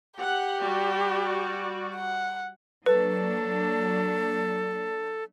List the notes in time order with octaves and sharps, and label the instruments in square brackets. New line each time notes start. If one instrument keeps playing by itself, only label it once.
[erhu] G4 [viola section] F#5
[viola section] G3 F#4 D5
[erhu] F#5
[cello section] F#3 A#3 D4 [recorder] A4 [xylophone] B4